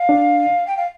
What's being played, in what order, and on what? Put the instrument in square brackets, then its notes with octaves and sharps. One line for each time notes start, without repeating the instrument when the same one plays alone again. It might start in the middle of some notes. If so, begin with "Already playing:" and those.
Already playing: [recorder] F5
[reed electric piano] D4
[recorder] G5
F5